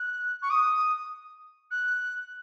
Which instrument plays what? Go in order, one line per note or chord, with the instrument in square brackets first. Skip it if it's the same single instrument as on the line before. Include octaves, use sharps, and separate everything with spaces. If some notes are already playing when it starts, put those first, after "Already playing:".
Already playing: [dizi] F#6
C#6
D#6
F#6